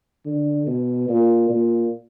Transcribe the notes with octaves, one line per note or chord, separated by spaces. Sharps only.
D3
B2
A#2
A#2